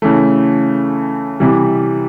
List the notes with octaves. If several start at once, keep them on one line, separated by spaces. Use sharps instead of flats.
C#3 E3 A3
C3 E3 G3